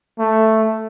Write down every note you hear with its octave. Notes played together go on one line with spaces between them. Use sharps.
A3